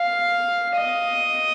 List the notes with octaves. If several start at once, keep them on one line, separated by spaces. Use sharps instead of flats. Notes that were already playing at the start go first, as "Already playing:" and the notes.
Already playing: F5
D#5